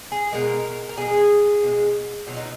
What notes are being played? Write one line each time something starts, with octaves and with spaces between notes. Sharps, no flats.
G#4
B2 G#3 A#4
A#4
B2 G#3 G#4
B2 G#3
B2 F#3 F4
D#4